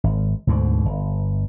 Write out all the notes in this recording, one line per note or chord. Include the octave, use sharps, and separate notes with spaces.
G#1
D2 G#2 B2 D3
G1